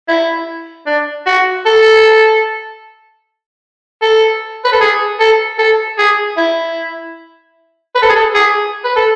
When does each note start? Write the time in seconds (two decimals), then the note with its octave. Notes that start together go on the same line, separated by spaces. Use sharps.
0.08 E4
0.86 D4
1.26 F#4
1.66 A4
4.02 A4
4.64 B4
4.73 A4
4.81 G#4
5.20 A4
5.59 A4
5.98 G#4
6.37 E4
7.95 B4
8.02 A4
8.09 G#4
8.16 A4
8.34 G#4
8.85 B4
8.96 A4